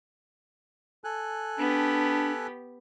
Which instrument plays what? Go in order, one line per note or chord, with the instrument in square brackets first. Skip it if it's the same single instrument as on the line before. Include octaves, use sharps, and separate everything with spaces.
[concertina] A4 G#5 F#6
[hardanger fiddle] B3 G4 [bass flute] D4